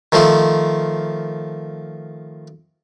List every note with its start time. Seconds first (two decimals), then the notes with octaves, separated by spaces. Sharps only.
0.12 D#3 F3 A3 C5